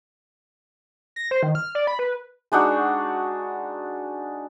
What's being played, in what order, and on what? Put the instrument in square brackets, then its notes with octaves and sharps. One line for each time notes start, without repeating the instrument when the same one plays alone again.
[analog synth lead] A#6
C5
D#3
F6
D5
B5
B4
[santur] G#3 D4 D#4 F#4